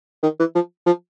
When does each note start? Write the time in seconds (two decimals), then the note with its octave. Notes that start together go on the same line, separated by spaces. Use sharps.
0.23 D#3
0.39 E3
0.55 F3
0.86 F3